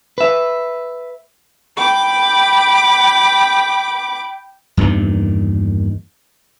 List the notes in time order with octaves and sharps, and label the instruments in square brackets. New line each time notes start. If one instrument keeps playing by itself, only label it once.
[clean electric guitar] B4 E5
[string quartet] G5 B5 D6
[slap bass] E2 G2 A#2 D#3